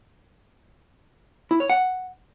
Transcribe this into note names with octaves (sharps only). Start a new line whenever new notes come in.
E4
C#5
F#5